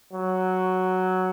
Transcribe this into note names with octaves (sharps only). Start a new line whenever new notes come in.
F#3